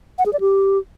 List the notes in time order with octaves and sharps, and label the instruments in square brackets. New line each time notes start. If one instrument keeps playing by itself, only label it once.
[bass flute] F#5
G#4
D5
G4